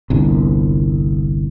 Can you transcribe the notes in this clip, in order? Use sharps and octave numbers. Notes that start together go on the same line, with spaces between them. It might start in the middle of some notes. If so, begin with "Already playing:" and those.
G1 C2